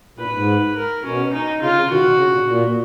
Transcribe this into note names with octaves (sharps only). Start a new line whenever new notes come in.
A#2 B4
G#2
A#4
B2 C#4
D#4
C#3 F4
C#3
B2 D#3 F#4
B2
C#3
A#2
A#2